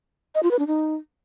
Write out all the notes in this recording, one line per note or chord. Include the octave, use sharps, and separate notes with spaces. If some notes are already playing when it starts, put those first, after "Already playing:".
D#5
F4
B4
D4
D#4